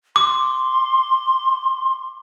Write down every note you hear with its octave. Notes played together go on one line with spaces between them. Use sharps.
C6 D6